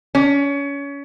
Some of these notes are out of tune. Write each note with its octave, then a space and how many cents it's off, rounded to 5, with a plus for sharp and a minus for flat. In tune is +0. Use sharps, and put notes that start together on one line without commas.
C#4 +25